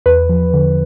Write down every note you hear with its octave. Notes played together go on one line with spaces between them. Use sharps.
E2 B4
F3
D3